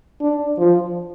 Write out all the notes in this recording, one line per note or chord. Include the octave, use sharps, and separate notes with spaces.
D4
F3